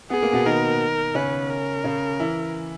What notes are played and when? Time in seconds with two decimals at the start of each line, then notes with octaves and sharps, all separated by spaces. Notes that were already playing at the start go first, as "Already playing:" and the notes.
0.10 B3 G#4
0.22 A#3
0.32 B2 B3
0.46 D#3 D#4 A#4
1.15 C#3 C#4 B4
1.50 A#4
1.84 C#3 C#4
2.19 E3 E4